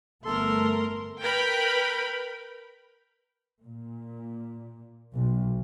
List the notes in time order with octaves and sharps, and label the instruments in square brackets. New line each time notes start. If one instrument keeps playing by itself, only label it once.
[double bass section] G1 A3 B3 [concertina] A4 [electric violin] A#4 C6
[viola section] A#4 B4 G5 B5
[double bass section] A#2
B1